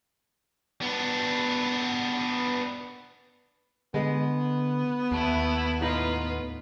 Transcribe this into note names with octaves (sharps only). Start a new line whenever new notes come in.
B3 D4
D3 G#3 B3
D#2 A3 E4
A2 D#4 F4 B4 F5